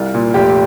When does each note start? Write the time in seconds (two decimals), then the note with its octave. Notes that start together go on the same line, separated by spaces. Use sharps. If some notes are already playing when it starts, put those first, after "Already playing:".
Already playing: C2 F4
0.14 A#2
0.34 F1 G4